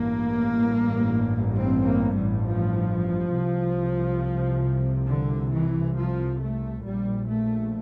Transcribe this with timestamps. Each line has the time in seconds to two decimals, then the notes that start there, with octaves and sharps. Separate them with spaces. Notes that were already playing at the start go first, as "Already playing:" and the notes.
Already playing: A1 G2 A#3
1.56 C4
1.86 A#3
2.15 G3
2.45 F3
3.33 C2 C3
5.08 D3
5.52 E3
5.96 F3
6.40 A3
6.84 A#1 A#2 G3
7.27 A3